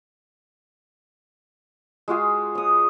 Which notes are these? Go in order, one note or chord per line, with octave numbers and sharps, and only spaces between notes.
G#3 F4 F#4 G#4
C#5 D#6